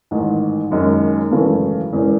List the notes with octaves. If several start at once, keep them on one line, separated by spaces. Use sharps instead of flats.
A1 G#2 D#3
F#1 F#2 D#3 G#3 C#4
G#1 F#2 C#3 E3 A3
E1 E2 C#3 G#3 C#4